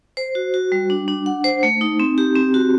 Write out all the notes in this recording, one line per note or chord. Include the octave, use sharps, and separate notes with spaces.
C5
F#4
F#4
G3
D4
D4
F#5
C5
A3
D#4
C4
G4
C4
F#4